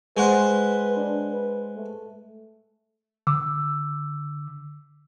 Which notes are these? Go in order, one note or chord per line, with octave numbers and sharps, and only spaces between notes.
G#3 B4 C5 F#5
D4
B4
A3
D3 D6 E6